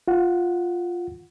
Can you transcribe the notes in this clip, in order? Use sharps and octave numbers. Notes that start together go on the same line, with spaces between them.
F4 F#5